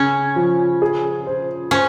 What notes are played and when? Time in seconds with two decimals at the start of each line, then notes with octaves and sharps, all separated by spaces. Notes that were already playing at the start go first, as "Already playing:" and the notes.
Already playing: C#3 C#4
0.36 F3
0.82 G#4
1.26 C5
1.71 C#4 C5